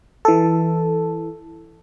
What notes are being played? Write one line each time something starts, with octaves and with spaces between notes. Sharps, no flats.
E3 A4